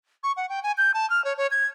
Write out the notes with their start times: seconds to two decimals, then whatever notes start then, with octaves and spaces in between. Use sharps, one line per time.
0.23 C#6
0.37 F#5
0.49 G5
0.63 G#5
0.78 G6
0.94 A5
1.10 F6
1.25 C#5
1.38 C#5
1.51 G#6